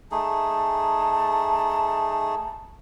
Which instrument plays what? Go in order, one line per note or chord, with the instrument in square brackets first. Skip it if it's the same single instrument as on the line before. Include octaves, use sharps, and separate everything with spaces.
[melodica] A3 D#4 G#4 [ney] A5